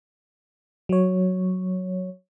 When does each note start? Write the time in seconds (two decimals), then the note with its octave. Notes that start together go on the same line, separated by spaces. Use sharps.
0.89 F#3 C#5